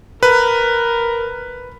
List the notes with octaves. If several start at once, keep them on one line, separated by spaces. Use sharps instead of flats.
A#4 B4